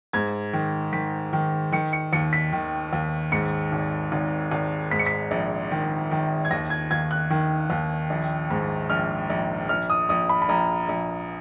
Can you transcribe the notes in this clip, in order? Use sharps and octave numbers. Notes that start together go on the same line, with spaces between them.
G#2 G#6
D#3
D#3 B6
D#3
D#3 C#7
C#7
D#2 C#7
B6
D#3
D#2
G#2 C#7
G#1
G#1
G#1
G#2 B6
C#7
B6
A#1
D#3
D#3
G#6
D#2 A#6
G#6
D#2 G#6
F#6
D#3
D#2
A#1
G#2
A#1 F6
A#1
A#1 F6
D#6
A#1 D#6
B5
B5
A#1 A#5
A#1